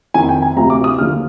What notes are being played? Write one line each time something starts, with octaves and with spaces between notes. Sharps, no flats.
F2 D#3 G#5
G5
G#5
D2 C3 F3 A#5
D6
D#6
D#2 D3 F3 F6